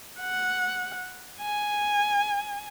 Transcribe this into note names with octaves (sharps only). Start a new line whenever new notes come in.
F#5
G#5